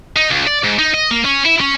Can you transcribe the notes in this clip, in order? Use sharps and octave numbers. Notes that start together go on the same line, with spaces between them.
D#4
C#2
D5
G#2
D#4
D#5
A#3
C#4
E4
C#4